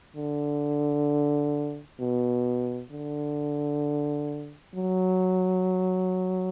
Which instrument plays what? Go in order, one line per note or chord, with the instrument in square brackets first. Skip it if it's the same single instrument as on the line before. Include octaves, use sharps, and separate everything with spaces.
[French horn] D3
B2
D3
F#3